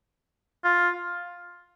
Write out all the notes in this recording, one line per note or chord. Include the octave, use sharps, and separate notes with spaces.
F4